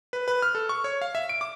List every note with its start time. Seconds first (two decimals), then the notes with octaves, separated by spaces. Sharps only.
0.13 B4
0.28 B4
0.42 F6
0.55 A4
0.69 C#6
0.84 C#5
1.02 F5
1.15 E5
1.29 D7
1.41 D6